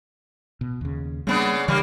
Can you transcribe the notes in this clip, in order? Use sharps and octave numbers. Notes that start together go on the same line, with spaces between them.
B2
D#2 C#3
C#3 G3 A#3 B3 D4
C#3 E3 G3 A#3